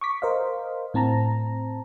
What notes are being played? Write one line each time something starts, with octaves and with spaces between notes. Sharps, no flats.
C#6 D6 B6
A#4 C5 D#5 F5
A2 C4 A5 A#5